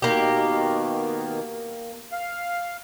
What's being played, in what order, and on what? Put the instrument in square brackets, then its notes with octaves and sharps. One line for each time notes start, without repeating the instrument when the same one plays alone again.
[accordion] B2 D#3 [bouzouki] A#3 G4
[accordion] F5